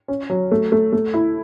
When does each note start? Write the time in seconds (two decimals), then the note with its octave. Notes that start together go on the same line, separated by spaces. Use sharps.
0.08 C#4
0.30 F#3
0.51 A3
0.72 A3
0.93 A3
1.14 E4